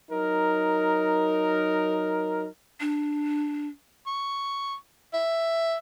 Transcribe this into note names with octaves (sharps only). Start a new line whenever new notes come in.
F#3 D#4 A#4
D4
C#6
E5